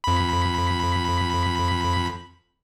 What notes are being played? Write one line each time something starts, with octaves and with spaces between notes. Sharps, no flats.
F2 B5